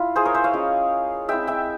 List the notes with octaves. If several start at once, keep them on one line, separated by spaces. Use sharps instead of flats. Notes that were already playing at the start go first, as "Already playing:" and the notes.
Already playing: E4 F4
G#4 C5
A#4 C#5
C5 E5
C#5 F5
G#3 C#4 F4
G#3 C4 E4 E5 G5
E5 G5